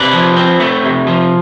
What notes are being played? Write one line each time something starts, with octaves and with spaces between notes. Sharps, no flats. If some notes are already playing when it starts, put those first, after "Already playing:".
Already playing: C3 B4 D5
F3
C4
A3
C3
F3